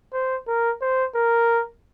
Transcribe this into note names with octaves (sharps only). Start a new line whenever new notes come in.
C5
A#4
C5
A#4